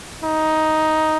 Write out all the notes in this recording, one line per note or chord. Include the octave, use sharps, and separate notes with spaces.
D#4